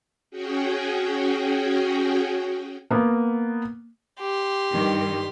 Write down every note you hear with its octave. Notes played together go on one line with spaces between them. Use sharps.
C#4 F#4 G#4 G5
A#3 B3
G4 C6
G2 D#3